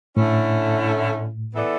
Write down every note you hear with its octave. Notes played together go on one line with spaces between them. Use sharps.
A2 D3 A3 C#4 E4
E3 B3 E4 A4 D5